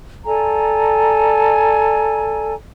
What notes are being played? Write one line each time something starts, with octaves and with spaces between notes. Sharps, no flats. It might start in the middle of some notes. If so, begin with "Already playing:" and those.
A4 D5 G#5 A#5